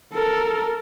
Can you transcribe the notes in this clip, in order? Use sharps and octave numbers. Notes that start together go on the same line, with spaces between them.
A4 A#4